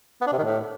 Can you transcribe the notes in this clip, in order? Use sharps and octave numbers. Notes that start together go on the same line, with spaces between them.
B3
D4
C3
D#3
A2